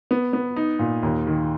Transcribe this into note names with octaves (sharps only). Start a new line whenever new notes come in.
B3
B3
D#4
A#2
D#2
D#3